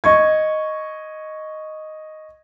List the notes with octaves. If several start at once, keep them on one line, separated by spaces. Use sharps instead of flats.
D#5 C#6 G#6